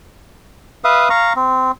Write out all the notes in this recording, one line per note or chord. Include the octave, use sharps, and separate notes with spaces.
B4 E5 F5 D#6
F5 A#5 C#6
C4